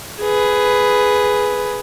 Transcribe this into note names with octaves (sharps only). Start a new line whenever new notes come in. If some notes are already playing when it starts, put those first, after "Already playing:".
G#4 B4